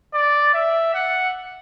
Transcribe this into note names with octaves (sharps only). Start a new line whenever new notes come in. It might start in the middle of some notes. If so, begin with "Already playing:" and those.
D5
E5
F#5